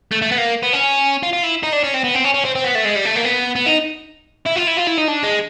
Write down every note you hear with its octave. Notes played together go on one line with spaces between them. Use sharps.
A3
A3
B3
A#3
B3
C#4
F4
F4
E4
D#4
D4
C#4
C4
B3
C4
C#4
C#4
C4
C4
B3
A3
G#3
G3
A3
A#3
B3
B3
D#4
E4
F4
E4
F4
E4
D#4
D4
G#3